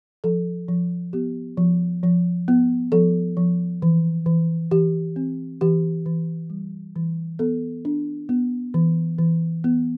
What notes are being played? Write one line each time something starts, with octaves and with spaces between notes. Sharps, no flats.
F3 A4
F3
B3 G4
F3
F3
B3
F3 A4
F3
E3
E3
E3 G4
C4
E3 G4
E3
G3
E3
B3 A4
D4
B3
E3
E3
B3